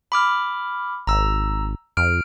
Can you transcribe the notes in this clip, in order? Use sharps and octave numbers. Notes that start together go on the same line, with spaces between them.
B5 D6 F6
G#1 A#5 E6
F2 F6 D7